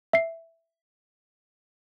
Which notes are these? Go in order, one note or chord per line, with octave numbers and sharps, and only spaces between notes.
E5 C7